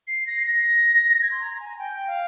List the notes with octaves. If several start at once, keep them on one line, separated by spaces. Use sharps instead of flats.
C7
A#6
C7
A#6
G#6
C6
A#5
G#5
G5
F5